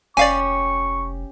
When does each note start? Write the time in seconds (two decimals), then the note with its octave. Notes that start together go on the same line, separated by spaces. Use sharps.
0.17 F1 C#4 G4 D5 F5 G#5 C#6